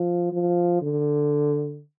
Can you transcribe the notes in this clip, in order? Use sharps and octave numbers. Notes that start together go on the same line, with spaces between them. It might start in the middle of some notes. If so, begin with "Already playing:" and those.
Already playing: F3
F3
D3